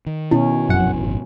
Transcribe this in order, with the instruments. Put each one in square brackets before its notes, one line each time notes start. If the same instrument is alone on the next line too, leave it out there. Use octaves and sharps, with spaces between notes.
[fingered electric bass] D#3
[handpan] B2 C#4 [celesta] E4
[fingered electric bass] F1 A#1 [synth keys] F#2 F#5
[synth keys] G#1